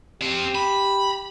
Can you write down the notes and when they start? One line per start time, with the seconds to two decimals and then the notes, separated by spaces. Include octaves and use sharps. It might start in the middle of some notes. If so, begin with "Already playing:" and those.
0.22 C4 G4 F5
0.55 B5